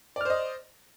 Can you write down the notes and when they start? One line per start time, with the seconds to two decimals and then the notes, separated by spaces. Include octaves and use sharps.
0.16 D5
0.21 F6
0.25 C5
0.30 D#5